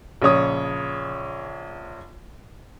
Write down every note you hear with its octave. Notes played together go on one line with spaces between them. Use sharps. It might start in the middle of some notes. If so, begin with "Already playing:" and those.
A#1 C#3 C#5 D#6